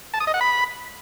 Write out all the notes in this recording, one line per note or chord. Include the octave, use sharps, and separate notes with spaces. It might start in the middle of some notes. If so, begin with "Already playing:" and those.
A5
D#6
D#5
F#5
B5